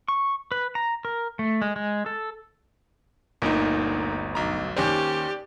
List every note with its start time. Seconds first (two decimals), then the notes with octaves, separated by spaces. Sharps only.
0.08 C#6
0.52 B4
0.75 A#5
1.05 A#4
1.39 A3
1.62 G#3
1.76 G#3
2.06 A4
3.42 G1 D2 A#2 A#3 D#4
4.35 B1 A#5
4.77 D#2 C#4 G4 C5 D5